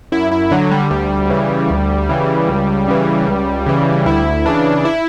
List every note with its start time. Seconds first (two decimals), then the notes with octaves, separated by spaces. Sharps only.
0.12 F#2 E4
0.32 E4
0.51 D3 F#3
0.71 G3
0.91 D2 G3
1.30 C#3 E3
1.70 D2
2.09 C#3 E3
2.49 C#2
2.88 C#3 E3
3.27 C#2
3.67 C#3 E3
4.06 D2 E4
4.46 C#3 E3 D4
4.85 E4